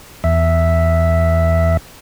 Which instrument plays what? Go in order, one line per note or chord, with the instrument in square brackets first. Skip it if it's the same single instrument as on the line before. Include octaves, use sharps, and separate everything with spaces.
[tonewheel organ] E2 E5